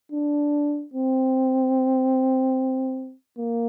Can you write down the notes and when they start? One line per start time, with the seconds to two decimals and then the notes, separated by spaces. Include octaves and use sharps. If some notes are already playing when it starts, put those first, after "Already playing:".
0.12 D4
0.94 C4
3.39 A#3